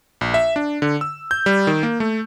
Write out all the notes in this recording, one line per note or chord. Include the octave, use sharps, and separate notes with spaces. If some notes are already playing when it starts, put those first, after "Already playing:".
A#1
E5
D4
D3
E6
G6
G3
D#3
A#3
A3